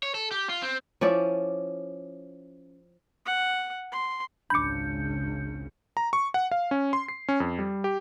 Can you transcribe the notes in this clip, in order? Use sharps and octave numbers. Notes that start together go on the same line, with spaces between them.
C#5
A4
G4
F4
C4
F3 C#4 E4 D5
F#5
C6
G#1 C#2 C#3 D4 B5 D6 G6 C#7
A#5
C#6
F#5
F5
C#4
C6
C7
C#4
F2
G3
G4